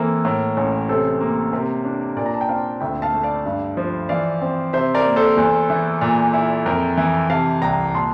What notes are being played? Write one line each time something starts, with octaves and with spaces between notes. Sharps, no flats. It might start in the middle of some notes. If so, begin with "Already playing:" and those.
Already playing: E3 A#3 C4 A4
A2 A#4
A1
C3 A4 C5
A#3 A#4
C3 A#4
D4
A#2 A#4 D5
A#5
A5
G5
C4 D5 F5
D2 E5 G5
F5 A5
A3
D5 F5
G2
F3
E3 D5 F5
C4
C3 C5 E5
A#4 D5
A#3
A4 C5
E2
E3
A#2
E4
F2 A#4
E3
C3 F5 A5
C2 G5 A#5
A#2 A5 C6